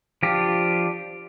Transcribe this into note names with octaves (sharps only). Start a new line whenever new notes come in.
F3 D4 F4 G4